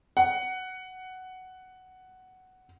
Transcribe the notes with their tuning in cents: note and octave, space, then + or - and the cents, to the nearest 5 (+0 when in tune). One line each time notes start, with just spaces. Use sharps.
F#5 +10